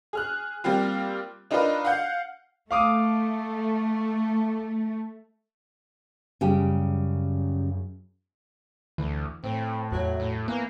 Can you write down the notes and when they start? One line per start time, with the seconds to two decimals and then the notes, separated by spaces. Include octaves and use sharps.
0.13 G#4 F6 F#6
0.64 G3 A#3 C4 F4
1.51 D4 D#4 F4 A#4 B4 D#5
1.85 F5 F#5 G6
2.71 A3 F5 D6 D#6
6.41 F#2 C#3 G3 G4
8.98 D2 E3
9.44 A2 C4
9.92 E2 F#3
10.20 A2
10.48 E3 A#3 B3